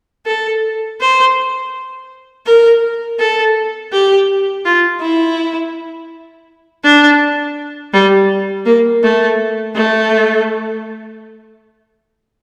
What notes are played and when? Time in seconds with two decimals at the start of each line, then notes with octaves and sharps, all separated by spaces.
0.26 A4
1.01 C5
2.46 A#4
3.19 A4
3.92 G4
4.65 F4
5.01 E4
6.84 D4
7.93 G3
8.66 A#3
9.03 A3
9.75 A3